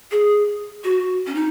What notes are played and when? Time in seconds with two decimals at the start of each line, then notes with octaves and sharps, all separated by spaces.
0.12 G#4
0.84 F#4
1.27 C#4
1.35 D#4